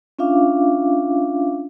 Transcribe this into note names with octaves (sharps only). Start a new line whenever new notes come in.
C#4 D4 F4 E5 F5 D6